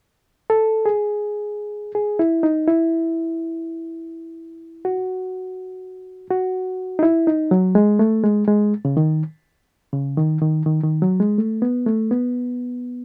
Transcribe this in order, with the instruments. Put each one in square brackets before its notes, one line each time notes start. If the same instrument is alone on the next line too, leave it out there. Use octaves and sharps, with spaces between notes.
[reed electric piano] A4
G#4
G#4
E4
D#4
E4
F#4
F#4
D#4
E4
D#4
F#3
G#3
A3
G#3
G#3
C#3
D#3
C#3
D#3
D#3
D#3
D#3
F#3
G#3
A3
B3
A3
B3